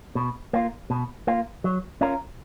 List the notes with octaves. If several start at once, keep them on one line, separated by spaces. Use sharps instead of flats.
B2
A#3 F4
B2
A#3 F4
F#3
C#4 F4 A#4